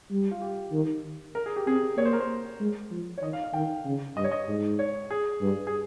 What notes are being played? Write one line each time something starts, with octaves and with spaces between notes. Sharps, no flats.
G3
F4
G4
D#3
A#4
G#4
G4
C4 G#4
A#3 C#5
C5
A#4
C5
G#3
F3
C#5
D#3 D#5
F5
F5
D#3 G5
C#3
G2 D#5
C#5
D#5
G#2
C#5
G#4
G2
G#4